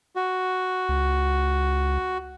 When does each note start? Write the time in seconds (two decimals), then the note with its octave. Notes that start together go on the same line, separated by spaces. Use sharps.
0.16 F#4
0.89 C#2